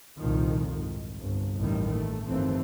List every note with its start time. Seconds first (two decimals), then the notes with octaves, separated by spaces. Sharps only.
0.19 C2 F2 A#2 D#3 F3
0.74 G#2
1.19 G1 C2 G2
1.59 A1 D#2 D#3 G3
1.89 A3
2.28 G1 D#2 E3 A3 C4